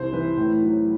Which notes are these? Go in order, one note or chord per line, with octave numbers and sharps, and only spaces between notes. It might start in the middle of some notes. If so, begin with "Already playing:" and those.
Already playing: C2 C5
E3 B4
A2
F#3